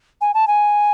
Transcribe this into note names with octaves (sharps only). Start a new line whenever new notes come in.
G#5
A5
G#5